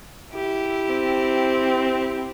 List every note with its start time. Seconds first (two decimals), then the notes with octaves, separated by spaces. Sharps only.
0.33 E4 G4
0.89 C4